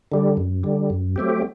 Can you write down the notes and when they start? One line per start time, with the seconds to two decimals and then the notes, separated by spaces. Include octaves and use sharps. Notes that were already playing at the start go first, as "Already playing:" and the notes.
0.12 D3 G3
0.37 F#2
0.63 D3 G3
0.90 F#2
1.16 F#3 A3 C4 G4